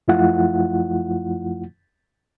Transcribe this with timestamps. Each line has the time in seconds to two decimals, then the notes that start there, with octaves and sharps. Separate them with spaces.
0.08 F#2 F3 A3 E4 F4 F#5